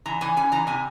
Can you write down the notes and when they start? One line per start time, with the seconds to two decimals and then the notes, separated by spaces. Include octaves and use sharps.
0.06 E3 A#5
0.21 E3 G#5
0.37 C#4 G#5
0.52 E3 A#5
0.67 C3 G#5